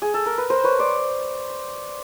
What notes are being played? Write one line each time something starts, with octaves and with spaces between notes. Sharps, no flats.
G#4
A4
A#4
B4
A#4 C5
B4 C#5
C5 D5